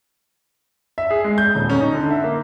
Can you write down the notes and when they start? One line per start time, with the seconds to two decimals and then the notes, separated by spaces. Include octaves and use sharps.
0.98 E5
1.11 G#4
1.24 G#3
1.38 G6
1.55 D#1
1.70 C#4
1.81 D#4
1.94 D3
2.11 E5
2.24 A#3